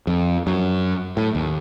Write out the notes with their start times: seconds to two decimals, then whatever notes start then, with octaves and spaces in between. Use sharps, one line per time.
0.07 F2
0.47 F#2
1.17 A2
1.35 D#2